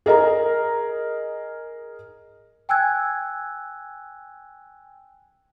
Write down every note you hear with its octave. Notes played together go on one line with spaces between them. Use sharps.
G#4 A#4 D#5 A#5
G5 G#5 E6 F#6 G#6